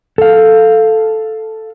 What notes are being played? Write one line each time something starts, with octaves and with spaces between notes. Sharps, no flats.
A4 F5